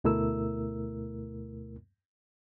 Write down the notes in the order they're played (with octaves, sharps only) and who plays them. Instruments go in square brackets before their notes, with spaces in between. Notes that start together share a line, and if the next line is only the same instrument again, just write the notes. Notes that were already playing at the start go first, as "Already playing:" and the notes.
[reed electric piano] D2 B2 A3 E4 A#4 E6